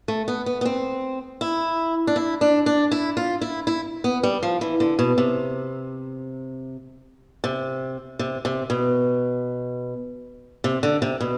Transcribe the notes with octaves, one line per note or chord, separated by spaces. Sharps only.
A3
B3
B3
B3
C4
E4
D4
E4
D4
D4
E4
F4
E4
E4
B3
G3
F3
E3
D3
B2
C3
C3
C3
C3
B2
C3
D3
C3
B2